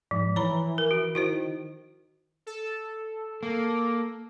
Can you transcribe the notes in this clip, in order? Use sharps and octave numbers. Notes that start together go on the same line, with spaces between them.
G#2 F3
E3 C#5 A#5 B5
A#4
F#4
D#3 E4 F#4 C5
A4
A#3